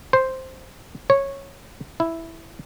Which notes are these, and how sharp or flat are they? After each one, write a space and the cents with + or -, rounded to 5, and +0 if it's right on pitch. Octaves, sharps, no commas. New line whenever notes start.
C5 +0
C#5 -10
E4 +0